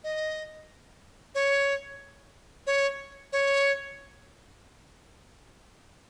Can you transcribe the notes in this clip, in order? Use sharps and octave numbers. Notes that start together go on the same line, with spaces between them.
D#5
C#5
C#5
C#5